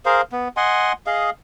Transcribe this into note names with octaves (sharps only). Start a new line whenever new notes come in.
G#4 A#4 C5 F5
B3
D#5 F#5 G#5 C6
G#4 D#5 F5